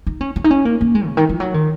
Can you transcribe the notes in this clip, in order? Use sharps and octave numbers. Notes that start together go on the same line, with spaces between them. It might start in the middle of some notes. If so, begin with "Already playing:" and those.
D#4
C#4
C#4
D#4
C#4
A#3
A#3
G#3
C#3
D#3
F3
F#3
D#3